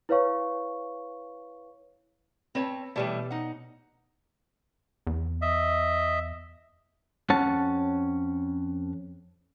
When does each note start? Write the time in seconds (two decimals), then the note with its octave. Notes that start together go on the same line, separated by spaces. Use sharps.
0.09 E4 B4 C#5 F5 C#6
2.55 C4 B4 C#5 A5
2.96 B2 E3 G3 A3 C#5 D5
3.31 D#4 F#5
5.07 E2
5.42 D#5 E5
7.30 F2 C#4 F#5 A5